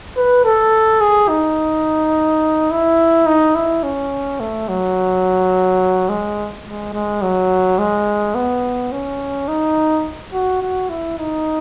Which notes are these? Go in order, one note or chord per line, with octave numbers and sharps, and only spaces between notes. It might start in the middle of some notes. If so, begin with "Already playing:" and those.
B4
A4
G#4
D#4
E4
D#4
E4
C#4
A3
F#3
G#3
G#3
G#3
F#3
G#3
B3
C#4
D#4
F#4
F#4
E4
D#4